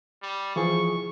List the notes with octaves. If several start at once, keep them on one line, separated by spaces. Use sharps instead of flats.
G3
E3 F3 G#4 C#6